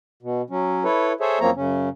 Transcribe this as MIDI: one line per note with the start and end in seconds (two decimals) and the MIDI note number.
0.22 0.42 47
0.50 0.84 54
0.50 0.84 61
0.84 1.13 64
0.84 1.13 69
0.84 1.13 71
0.84 1.13 73
1.20 1.39 68
1.20 1.39 69
1.20 1.39 72
1.20 1.39 73
1.20 1.39 76
1.40 1.50 42
1.40 1.50 53
1.40 1.50 58
1.40 1.50 60
1.40 1.50 73
1.40 1.50 82
1.56 1.89 42
1.56 1.89 49
1.56 1.89 61